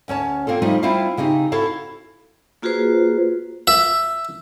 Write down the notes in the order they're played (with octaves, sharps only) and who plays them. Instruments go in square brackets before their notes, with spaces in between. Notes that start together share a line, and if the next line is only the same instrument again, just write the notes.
[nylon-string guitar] D2 C#4 C#5 A5
A#3 C4 F4 A4
F3 G3 A3 D#4 F4
G3 C4 E4 F4 C5 F5
C#3 C4 D#4 G4
E4 F#4 A4 F5
[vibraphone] A#3 F4 F#4 G#4 B4 C5
[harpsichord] E5